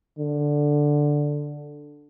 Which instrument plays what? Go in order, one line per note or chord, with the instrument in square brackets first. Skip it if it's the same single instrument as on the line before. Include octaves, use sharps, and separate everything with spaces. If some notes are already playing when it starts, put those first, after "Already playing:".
[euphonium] D3